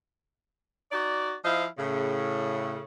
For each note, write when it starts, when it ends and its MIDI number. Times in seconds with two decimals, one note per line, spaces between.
0.92 1.33 63
0.92 1.33 66
0.92 1.33 74
1.44 1.65 53
1.44 1.65 64
1.44 1.65 72
1.44 1.65 75
1.44 1.65 77
1.78 2.82 45
1.78 2.82 49